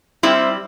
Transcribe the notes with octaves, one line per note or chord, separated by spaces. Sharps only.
G3 C4 E4